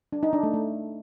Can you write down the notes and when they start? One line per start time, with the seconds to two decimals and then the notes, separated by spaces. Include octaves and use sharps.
0.13 D4
0.23 D#4
0.33 D4
0.43 A3
0.54 A3